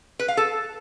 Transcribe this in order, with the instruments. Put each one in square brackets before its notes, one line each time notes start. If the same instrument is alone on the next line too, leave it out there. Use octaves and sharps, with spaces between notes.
[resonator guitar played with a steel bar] B4
F5
A4